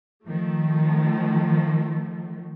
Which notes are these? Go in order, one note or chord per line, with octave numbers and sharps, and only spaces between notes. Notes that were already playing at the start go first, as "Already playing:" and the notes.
D#3 F3 A3